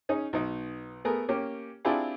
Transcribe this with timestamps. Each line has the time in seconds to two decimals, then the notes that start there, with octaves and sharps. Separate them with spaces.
0.09 C#4 D#4 G#4
0.33 B1 D#4
1.05 A3 B3 G#4 A#4
1.28 A#3 C#4 G4
1.85 C4 D4 E4 F4 G4 G#4